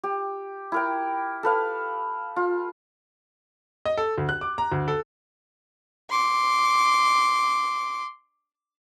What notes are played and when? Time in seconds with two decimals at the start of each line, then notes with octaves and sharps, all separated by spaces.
0.04 G4
0.72 E4 A#4 G5
1.43 A4 B4 F5
2.36 F4
3.86 D#5
3.97 A4
4.18 D2
4.29 F#6
4.41 D6
4.58 A#5
4.72 D2
4.88 A4
6.10 C6 D6